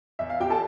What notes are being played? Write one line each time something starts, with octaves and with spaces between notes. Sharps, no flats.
E2 E5
F5
E2 G4 G5
A4 A5